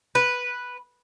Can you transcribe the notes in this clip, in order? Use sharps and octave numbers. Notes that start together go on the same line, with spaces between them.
B4